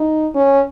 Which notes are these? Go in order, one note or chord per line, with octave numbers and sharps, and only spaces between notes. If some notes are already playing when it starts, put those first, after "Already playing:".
Already playing: D#4
C#4